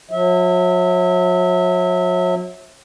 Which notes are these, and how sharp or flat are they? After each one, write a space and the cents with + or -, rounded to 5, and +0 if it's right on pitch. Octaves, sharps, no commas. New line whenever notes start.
F#3 -40 E5 -25